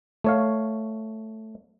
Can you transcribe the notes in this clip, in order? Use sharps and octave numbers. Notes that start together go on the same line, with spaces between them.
A3 C#5 F5